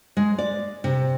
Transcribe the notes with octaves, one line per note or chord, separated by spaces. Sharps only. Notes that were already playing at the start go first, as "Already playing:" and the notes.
G#3
D5
C3